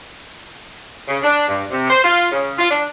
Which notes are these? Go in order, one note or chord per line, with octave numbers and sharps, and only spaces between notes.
C#3
D4
G2
C3
C5
F4
C#3
F4
D4